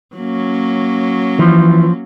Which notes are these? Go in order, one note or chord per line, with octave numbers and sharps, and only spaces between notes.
F#3 A#3 C#4
E3 F3